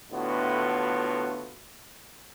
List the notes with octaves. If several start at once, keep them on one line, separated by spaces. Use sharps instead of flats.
A2 D3 B3 F4 F#4